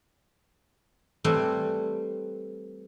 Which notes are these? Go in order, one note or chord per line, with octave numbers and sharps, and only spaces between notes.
E3 G3 A3 C4 E4